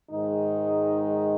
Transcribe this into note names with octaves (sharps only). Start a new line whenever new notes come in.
G#2 D#3 G#3 D#4